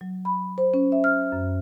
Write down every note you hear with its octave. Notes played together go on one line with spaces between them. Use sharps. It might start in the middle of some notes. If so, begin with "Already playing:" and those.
F#3
B5
C5
C#4
E5
F6
F#2